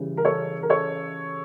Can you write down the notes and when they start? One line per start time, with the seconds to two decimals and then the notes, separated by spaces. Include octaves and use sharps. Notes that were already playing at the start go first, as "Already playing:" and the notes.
Already playing: C#3 E3 G3
0.17 A#4
0.25 A4 C#5
0.63 A#4
0.69 A4 C#5